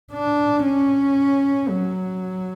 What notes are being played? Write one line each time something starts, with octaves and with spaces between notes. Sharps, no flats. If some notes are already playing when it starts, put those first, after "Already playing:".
D4
C#4
F#3